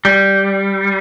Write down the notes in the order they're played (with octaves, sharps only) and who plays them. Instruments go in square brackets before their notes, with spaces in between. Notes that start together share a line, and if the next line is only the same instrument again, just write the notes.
[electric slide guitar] G3